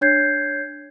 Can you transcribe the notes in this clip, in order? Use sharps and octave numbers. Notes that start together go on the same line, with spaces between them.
D4 C#5 G6 G#6 C7